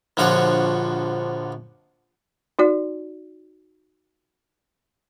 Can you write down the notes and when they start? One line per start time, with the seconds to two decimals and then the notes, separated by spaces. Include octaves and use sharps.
0.17 A#1 D3 F3 F#4 C#5
2.59 D#4 F#4 D5